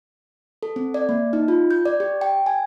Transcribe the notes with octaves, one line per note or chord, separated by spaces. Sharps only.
A4
C4
D5
A#3
D#4
F4
G6
D5
G4
G5
G#5